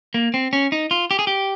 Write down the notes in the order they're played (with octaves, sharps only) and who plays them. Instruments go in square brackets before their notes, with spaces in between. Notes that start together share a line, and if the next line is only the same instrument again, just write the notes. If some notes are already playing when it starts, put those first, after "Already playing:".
[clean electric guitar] A#3
C4
C#4
D#4
F4
G4
G#4
G4